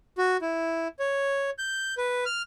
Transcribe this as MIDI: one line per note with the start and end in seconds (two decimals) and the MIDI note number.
0.18 0.37 66
0.42 0.88 64
0.99 1.50 73
1.58 1.95 91
1.97 2.25 71
2.26 2.42 89